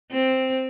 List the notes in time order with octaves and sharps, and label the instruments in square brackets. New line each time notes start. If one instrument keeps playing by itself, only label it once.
[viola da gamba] C4